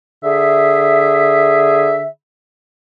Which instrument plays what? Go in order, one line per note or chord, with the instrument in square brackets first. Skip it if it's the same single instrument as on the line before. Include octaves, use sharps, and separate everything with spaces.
[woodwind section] D3 G#4 E5